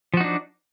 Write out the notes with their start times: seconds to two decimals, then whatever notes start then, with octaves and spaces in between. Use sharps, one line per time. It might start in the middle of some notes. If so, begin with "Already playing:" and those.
0.14 F3
0.17 F#4
0.21 D#4
0.24 D4